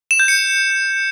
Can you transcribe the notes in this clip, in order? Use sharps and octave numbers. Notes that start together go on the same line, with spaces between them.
E7
G6
C#7